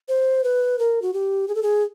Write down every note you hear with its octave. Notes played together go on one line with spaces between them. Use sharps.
C5
B4
A#4
F#4
G4
G#4
A4
G#4